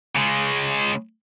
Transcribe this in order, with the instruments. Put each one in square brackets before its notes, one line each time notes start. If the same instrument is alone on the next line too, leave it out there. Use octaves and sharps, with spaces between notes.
[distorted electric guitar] C#3 G#3